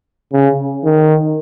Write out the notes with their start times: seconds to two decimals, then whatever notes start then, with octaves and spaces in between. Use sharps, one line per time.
0.33 C#3
0.85 D#3